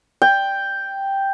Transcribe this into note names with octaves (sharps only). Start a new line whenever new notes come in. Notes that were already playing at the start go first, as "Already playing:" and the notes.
G5